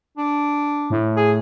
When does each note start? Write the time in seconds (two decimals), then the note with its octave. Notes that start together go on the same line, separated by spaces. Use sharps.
0.18 D4
0.90 A2
1.16 G#4